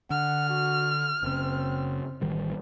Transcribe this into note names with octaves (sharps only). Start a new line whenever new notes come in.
D3 F#5 F6
F#4
F#1 C#3 C4
A1 D#3 G3